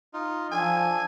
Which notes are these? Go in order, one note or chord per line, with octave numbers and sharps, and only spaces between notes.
D#4 F4
F3 D4 A4 G#5